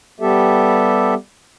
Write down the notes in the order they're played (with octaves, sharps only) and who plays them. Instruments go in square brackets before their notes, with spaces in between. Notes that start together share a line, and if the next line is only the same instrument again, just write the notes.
[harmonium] G3 B3 G4 A4 E5